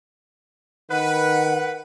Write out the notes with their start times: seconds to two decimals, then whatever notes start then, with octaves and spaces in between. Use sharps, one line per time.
0.91 D#3 B4 F#5